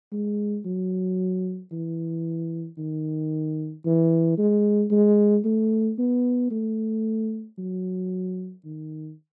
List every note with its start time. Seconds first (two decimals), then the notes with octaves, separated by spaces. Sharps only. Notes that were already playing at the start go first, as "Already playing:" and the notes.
0.12 G#3
0.65 F#3
1.72 E3
2.78 D#3
3.85 E3
4.38 G#3
4.91 G#3
5.45 A3
5.98 B3
6.51 A3
7.58 F#3
8.64 D#3